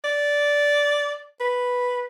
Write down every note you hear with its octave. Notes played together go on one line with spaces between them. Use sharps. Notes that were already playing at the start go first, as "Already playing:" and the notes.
D5
B4